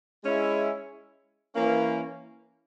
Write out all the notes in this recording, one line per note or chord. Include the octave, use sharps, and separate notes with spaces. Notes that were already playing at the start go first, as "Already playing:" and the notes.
G#3 C#4 E4
E3 A#3 C#4